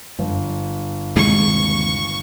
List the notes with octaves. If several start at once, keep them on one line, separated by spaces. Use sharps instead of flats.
G1 F#2
D#2 C3 E3 G#3 C#6